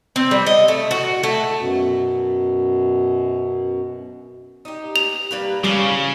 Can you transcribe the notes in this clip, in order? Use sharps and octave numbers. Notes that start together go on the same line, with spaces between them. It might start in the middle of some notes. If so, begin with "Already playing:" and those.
C4
G3
D#5
A3
F#4
A3
F#2 B2
D#4 G4
F7
G3 A#3 B4
C#3 E3 G3 C#4 F4